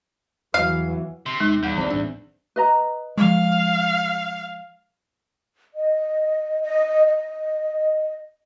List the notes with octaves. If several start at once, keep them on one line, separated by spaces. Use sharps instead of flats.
E2 E3 F#3 F5
C3 C6
D#2 G#3 D#4
D#1 E2 G3 F#5
C2 E3 G3 C4 C5 D5
A#1 A2 D4 E6
B4 D#5 A#5
F3 G#3 F5
D#5
D#5
D#5